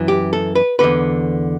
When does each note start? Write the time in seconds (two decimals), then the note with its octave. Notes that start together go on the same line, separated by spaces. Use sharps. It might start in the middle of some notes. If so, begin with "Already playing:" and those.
Already playing: F#2 E3
0.08 G4
0.33 A4
0.55 B4
0.79 E2 D3 B4